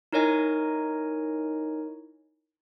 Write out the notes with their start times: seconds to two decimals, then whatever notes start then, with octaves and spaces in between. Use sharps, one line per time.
0.13 D#4 E4 A#4 C#5 D#5 G#5